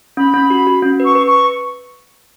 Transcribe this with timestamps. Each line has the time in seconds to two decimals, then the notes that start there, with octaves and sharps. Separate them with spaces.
0.17 C#4 B5
0.34 C#4
0.50 F#4
0.67 F#4
0.83 C#4
1.00 B4
1.05 C#6
1.15 B4
1.27 C#6